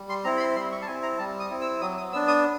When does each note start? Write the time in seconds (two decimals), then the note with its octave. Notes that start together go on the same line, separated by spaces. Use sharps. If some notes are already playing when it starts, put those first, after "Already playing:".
Already playing: G3
0.09 C6
0.24 C4 E4 A#5
0.37 B5
0.40 C6
0.56 G3 C6
0.72 C#6
0.82 A5
0.87 C4 E4 G#5
1.03 A#5
1.18 G3 A5
1.40 D#6
1.50 C4 E4
1.61 E6
1.81 F#3 D#6
1.97 D#6
2.12 B3 D4 E6
2.28 D#6